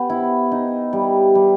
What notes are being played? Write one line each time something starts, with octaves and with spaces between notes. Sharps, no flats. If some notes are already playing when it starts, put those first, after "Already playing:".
Already playing: B3 G4
E4
D#4
G3
G3